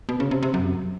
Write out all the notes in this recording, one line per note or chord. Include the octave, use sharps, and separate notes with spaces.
B2
C#3
C3
C3
F#2